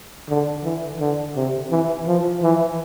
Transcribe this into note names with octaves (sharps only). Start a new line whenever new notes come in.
D3
E3
D3
C3
E3
F3
E3